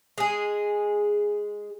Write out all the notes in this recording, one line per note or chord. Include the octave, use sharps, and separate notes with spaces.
G#3 G#4